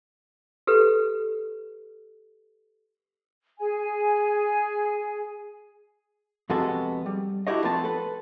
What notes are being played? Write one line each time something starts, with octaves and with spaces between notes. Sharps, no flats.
G4 A4 B4
G#4 G#5
F2 C3 G#3 B3 F#4 A4
G3
D4 E4 F#4 G4 C#5 D#5
F3 A3 B3 C4 F4 A5
A4 B4